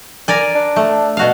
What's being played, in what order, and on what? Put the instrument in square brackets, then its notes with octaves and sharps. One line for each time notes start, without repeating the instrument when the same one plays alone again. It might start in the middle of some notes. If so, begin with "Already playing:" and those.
[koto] A#4 D5 G#5
[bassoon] D4
[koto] A3
B2 F#4 F5